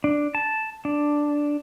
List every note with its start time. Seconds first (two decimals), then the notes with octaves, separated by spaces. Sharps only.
0.04 D4
0.35 A5
0.85 D4